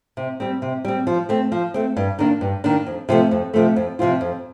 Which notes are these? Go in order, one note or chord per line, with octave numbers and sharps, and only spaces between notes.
C3
G3 C4
C3
G3 C4
F3
A3 C4
F3
A3 C4
G2
D#3 A#3 D4
G2
D#3 A#3 D4
F2
C3 F3 A3
F2
C3 F3 A3
F2
C3 F3 C4 F4
F2